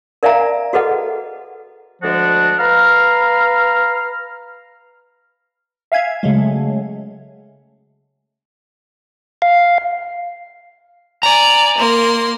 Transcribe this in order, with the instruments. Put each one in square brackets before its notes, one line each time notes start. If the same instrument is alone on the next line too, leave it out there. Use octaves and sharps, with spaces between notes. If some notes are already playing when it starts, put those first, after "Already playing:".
[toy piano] A#4 D5 E5 F5 G#5 A#5
F#4 G#4 A4 B4 D#5 F#5
[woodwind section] D2 F3 G#3 D4 F#4 F#5
B4 F5 A#5 F6
[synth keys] E5 F5 G#5 G#6
C#3 F#3 G#3 A3
[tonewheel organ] F5
[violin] D5 G#5 [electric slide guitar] A#5
[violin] A#3 C6